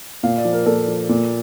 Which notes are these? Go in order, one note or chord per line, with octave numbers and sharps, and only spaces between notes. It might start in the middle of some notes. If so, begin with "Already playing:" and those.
A#2 F5
D5
F3
A#4
A#2 A4
F3
A#2